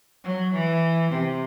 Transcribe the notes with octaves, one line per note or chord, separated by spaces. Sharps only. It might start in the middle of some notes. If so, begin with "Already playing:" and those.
F#3
E3
C3